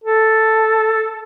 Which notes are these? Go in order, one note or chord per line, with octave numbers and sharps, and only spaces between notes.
A4